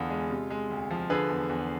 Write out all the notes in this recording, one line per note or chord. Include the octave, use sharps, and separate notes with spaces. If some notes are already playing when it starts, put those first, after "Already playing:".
Already playing: E2 D3 B3 F4 A4
G#3
C3
G#3
D2
F3
D3 G#4 B4
E2
E2